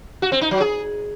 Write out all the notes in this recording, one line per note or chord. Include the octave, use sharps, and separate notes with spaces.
F#4
C4
D#4
F#3
G#4